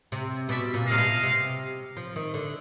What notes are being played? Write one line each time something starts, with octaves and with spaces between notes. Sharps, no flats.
C3
B2 D5 E5
A#2
C3 D#5 F5
B2
C3
F3
D#3
D3